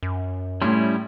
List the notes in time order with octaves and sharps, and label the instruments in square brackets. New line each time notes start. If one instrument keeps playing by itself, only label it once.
[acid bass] F#2
[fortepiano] A2 C6 [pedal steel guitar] G3 C#4 E4